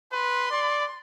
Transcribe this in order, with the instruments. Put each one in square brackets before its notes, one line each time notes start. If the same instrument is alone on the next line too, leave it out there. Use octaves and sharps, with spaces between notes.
[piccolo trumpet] B4 [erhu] C6
[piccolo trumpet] D5